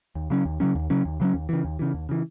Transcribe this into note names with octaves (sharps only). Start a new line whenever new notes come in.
D#2
C#3 F#3 C#4
D#2
C#3 F#3 C#4
D#2
C#3 F#3 C#4
D#2
C#3 F#3 C#4
D#2
C#3 E3
D#2
C#3 E3
D#2
C#3 E3